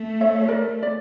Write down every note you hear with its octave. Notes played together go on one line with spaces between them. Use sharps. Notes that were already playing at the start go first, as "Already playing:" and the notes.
Already playing: A3
C#5 E5
C#5
A#4 D5
D5